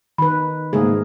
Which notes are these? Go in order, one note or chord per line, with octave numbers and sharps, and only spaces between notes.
D#3 B4 B5
G#2 C#3 A3 A#3 G#4 A#4